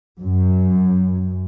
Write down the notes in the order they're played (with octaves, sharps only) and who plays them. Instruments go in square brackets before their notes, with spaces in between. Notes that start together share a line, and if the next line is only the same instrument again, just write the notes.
[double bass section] F#2